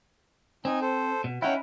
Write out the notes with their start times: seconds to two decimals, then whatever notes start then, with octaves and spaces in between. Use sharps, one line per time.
0.65 C4 D#4 G#5
0.81 A4 C5
1.24 B2
1.42 C#4 D#4 E4 C#5 F#5 G5